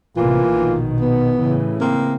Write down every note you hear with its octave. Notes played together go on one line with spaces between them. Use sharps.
A1 C3 E3 A#3 F4
A#1 B2 D#3
B3
A2 C#3 E3
A#3 C4